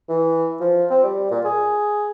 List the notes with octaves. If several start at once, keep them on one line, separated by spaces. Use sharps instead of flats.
E3
F3
C4
G3
A#2
G#4